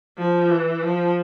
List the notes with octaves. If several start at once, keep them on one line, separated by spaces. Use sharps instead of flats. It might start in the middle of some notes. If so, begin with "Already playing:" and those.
F3
E3
F3